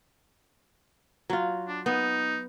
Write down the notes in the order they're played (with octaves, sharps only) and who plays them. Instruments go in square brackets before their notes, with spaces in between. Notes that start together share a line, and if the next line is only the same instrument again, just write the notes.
[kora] F#3 F4
[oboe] D4
[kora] B3 [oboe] D#4